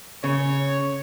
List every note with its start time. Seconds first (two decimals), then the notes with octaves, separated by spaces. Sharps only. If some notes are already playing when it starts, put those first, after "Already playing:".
0.24 C#3 C#5